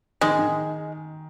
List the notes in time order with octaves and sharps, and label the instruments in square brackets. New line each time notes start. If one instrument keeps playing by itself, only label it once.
[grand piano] D#3 [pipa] G#3
[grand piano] D#3